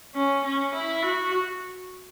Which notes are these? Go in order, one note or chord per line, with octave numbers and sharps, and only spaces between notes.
C#4
C#4
E4
F#4